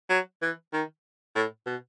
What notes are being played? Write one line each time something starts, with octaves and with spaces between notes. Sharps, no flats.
F#3
E3
D#3
A2
B2